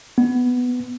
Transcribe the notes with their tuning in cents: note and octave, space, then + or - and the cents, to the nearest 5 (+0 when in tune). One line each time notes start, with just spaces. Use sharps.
B3 +5